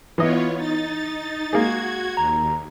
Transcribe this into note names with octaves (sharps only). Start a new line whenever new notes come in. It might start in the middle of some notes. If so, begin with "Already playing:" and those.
E3 B3 E4 F4 C#5 D#5
D#4 A6
G#3 A#3 F#4 G#4 G#6
D#2 A#5